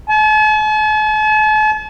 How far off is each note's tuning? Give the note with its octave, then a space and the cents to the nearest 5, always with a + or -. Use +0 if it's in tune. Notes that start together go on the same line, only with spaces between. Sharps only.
A5 -45